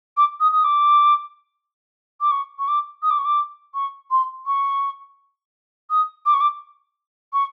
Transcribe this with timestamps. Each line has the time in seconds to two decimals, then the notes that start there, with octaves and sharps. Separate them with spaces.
0.17 D6
0.40 D#6
0.52 D#6
0.64 D6
2.21 D6
2.31 C#6
2.59 C#6
2.68 D6
3.02 D#6
3.10 D6
3.18 C#6
3.25 D6
3.74 C#6
4.11 C6
4.46 C#6
5.90 D#6
6.26 D6
6.34 C#6
6.40 D6
7.33 C#6